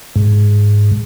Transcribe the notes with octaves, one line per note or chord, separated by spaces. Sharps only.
G#2